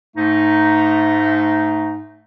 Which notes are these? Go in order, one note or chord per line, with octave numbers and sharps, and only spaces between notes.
G#2 A3 D#4